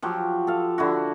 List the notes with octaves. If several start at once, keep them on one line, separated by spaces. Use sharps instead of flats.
F3 F#3 G4
A4 F5
D3 E4 F#4